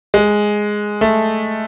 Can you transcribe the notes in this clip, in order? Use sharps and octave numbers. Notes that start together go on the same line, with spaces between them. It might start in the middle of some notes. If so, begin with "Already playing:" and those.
G#3
A3